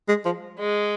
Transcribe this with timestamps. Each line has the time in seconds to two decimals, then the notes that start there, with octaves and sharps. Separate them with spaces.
0.08 G#3
0.25 F3
0.59 G#3